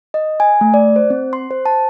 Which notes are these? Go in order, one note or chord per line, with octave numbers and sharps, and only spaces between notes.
D#5
G#5
A3
D5
C5
C4
C6
C5
A5